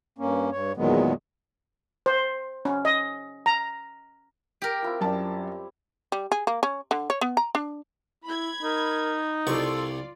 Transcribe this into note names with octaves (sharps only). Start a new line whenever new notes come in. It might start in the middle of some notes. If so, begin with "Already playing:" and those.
G2 A#3 C#4
G2 C#5
E2 A#2 D#3 F#3 G#3 B3
C5
C#4
D#5
A#5
G4 A#4
C4 E4 F4
F#2 G3 C4 E4 A5
G3
G#4
A#3
C#4
D3
C#5
B3
A#5
D4
E4 B5 G#6
D#4 A#4
C2 F4 A4 D5 C#6